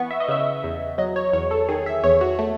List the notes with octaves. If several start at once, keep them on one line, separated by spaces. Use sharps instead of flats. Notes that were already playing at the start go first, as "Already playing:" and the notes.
Already playing: E3 B3 C#6
E5
D#5
C#3 E5
E2
F#3 D#5
C#5
E2 C#5
A4
D#3 G#4
E5
E2 C#5
F#4
A3